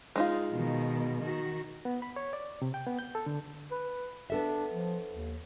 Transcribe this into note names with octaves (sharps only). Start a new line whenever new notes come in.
G#3 D#4 F4
B2 D#3
D#3 F#4
B3
B5
C#5
D5
C3
G5
B3
G6
A4
D3
B4
B3 D4 A4 E5
F3
D#2